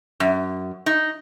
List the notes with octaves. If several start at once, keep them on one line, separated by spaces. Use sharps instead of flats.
F#2
D#4